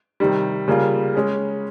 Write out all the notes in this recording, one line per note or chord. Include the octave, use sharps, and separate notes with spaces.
C3 D#3 G3
C#3 G3 A#3 F4
G#3 C#4 G#4